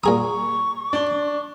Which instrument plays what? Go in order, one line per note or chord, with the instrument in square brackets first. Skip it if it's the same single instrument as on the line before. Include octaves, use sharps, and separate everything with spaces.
[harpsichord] A#2 G#4 D#6 [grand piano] A#5 [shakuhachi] C#6
[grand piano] D4 G7